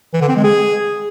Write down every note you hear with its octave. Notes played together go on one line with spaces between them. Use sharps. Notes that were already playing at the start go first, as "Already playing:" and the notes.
E3
D3
C4
G#3
G#4